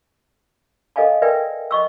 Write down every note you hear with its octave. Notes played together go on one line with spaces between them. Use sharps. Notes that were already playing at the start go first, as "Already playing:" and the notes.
A4 D#5 F5 G#5 A5
A#4 B4 D5 E5 G5 G#5
D#5 C#6 E6